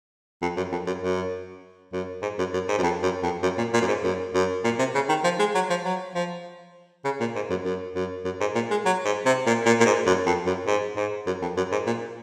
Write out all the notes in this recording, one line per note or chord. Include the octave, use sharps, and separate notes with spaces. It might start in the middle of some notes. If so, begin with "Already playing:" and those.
F2
F#2
F2
F#2
F#2
F#2
G#2
F#2
F#2
G#2
F#2
F2
F#2
F2
F#2
A#2
A#2
F#2
G#2
F#2
F#2
A#2
C3
C#3
D#3
F3
G#3
F#3
F3
F#3
F3
C#3
A#2
G#2
F#2
F#2
F#2
F#2
G#2
A#2
G#3
F#3
G#2
C3
A#2
A#2
A#2
G#2
F#2
F2
F#2
G#2
G#2
F#2
F2
F#2
G#2
A#2